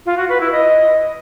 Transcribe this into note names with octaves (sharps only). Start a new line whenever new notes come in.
F4
F#4
B4
E4
D#5